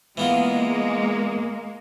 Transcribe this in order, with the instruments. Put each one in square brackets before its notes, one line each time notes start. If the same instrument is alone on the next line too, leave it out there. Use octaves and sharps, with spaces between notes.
[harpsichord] E3 B3 F4 [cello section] G#3 A#3